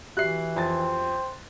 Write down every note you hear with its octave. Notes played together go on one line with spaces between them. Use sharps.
E3 F#4 G4 E5 F#6 C7
F2 C5 G5 A6